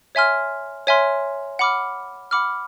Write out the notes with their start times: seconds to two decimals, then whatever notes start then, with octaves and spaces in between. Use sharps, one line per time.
0.15 C#5 E5 G#5 C6 F6
0.87 C#5 E5 G#5 C6 F6
1.59 F#5 B5 D6 F6
2.31 F#5 B5 D6 F6